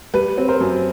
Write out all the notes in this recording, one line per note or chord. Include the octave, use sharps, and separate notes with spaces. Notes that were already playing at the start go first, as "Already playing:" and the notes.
G3 B4
C4
A#4 C5
F#2